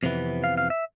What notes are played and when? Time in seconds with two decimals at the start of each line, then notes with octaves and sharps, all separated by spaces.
0.03 F2 C3 E3 B3
0.44 F5
0.58 F5
0.70 E5